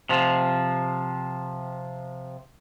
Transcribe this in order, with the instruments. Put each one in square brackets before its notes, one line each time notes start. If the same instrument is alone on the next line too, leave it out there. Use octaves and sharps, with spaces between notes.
[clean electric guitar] C3 F3